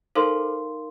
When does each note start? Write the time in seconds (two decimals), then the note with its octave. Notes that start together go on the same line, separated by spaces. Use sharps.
0.15 D#4 A4 A#4 C5 F5 C6